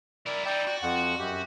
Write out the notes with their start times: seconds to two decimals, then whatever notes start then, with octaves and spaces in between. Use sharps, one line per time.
0.26 E4 A#4 D5
0.45 D#4 E4 D5 G5
0.67 F#4
0.82 F2 F#5
1.19 F#2 G4